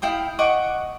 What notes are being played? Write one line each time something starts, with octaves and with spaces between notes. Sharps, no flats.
E4 F5 G5 D#6
D#5 F#5 C#6 D6